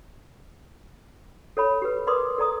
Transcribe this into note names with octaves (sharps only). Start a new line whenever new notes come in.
A4 C#5 B5
G4 B4
A#4 B4 D5 C6 D6 D#6
A4 D5 A#5 D#6